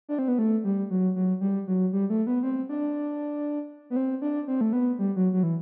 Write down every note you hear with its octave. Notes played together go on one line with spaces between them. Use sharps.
D4
C4
B3
A3
G3
F#3
F#3
G3
F#3
G3
A3
B3
C4
D4
B3
C4
D4
C4
A3
B3
G3
F#3
F#3
E3